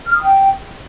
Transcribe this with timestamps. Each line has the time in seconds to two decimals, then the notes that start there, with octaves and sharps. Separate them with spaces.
0.06 F6
0.14 D#6
0.22 G5